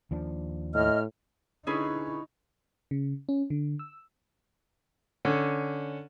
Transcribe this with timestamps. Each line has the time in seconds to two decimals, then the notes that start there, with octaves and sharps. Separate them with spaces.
0.11 D#2 F3 D4
0.74 A2 D#5 F6
1.67 D3 C#4 D#4 E4 G#4 B4 B5 C#6
2.91 C#3
3.29 C#4
3.50 D3
3.79 E6
5.25 D3 C#4